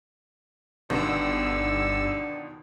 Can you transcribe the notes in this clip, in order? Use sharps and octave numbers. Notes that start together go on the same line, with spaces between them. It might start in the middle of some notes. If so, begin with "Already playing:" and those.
G1 C#2 B2 D3 D#3 E6